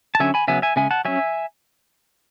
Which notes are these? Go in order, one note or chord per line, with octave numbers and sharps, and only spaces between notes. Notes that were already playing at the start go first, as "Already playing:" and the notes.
A5
D3 F#3 C#4 E5 G#5
G#5 B5
C#3 F#3 B3 E5 G#5
E5 G#5
C#3 G#3 C#4 E5 G#5
F#5 A5
F#3 C#4 E5 G#5